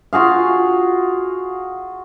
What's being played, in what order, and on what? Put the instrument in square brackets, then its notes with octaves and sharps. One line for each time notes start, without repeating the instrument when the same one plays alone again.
[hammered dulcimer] F4 F#4 G#4 F5